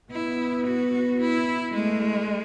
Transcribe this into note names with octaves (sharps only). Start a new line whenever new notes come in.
B3 E4
F#4
E4
G#3 A3